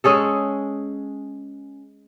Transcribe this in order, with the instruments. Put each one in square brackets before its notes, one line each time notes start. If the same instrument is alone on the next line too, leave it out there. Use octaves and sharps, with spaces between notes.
[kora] G#3 C#4 G#4 A4